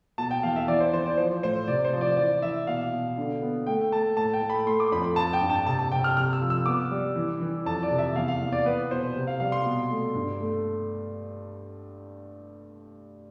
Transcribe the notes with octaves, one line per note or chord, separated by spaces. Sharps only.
B2 A5
G5
E2 F5
E5
E3 D5
C5
E3 C5
D5
F3 C5
A2 C5
C3 D5
C5
F3
D5
E3 D5
E3 E5
B2 F5
B2
D3
B3
A3 G5
A3 A5
A2 A5
G5
A3
B5
A3 C6
D6
F2 B5
B5
F3 A5
G5
G2
A5
C3 A5
A5
C3 G5
F6
C3 F6
E6
F3
E6
B3 D6
G3
E3
E3
F2 A5
D5
C3
E5
E2 F5
F5
E2
D5
B3 B4
B2 C5
C3
F5
G3 F5
C6
B2
A3
G2
A3